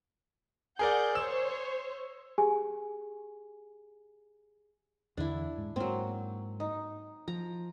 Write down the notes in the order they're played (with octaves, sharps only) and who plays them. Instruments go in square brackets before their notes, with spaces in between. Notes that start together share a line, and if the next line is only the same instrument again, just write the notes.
[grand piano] G#4 A#4 D5 [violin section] F#5 G6
[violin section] C5 C#5 [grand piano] E6 E7
[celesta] G4 G#4 G#5
[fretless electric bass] E2 D3 E3 [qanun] D4 E4
[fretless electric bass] G#2
[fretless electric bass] G#2 A#3 [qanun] F#3 C4
[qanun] D#4
[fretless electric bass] F3 [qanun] A#5